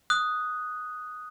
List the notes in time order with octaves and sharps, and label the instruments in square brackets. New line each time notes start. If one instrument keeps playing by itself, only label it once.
[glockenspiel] D#6 F#6